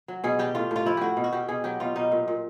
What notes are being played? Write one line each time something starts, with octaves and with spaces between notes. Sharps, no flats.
F#3
B2 G#4
G3 G4
A2 F4
A2 F4
F3 E4
A2 F#4 G4
B2
F#4
B2 G4
B2 G#4
F#3 G4
B2 F4
B2 D#4
A#2
A#2